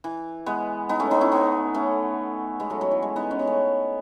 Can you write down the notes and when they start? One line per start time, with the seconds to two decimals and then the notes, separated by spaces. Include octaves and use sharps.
0.04 E3
0.46 G#3 B3
0.89 B3 D#4
1.00 A3 C#4
1.11 B3 D#4
1.21 C#4 E4
1.32 B3 D#4
1.74 A3 C#4
2.60 G#3 B3
2.70 F#3 A3
2.81 F#3
2.91 E3
3.02 G#3
3.16 B3 D#4
3.31 C#4
3.39 B3
3.47 A3 C#4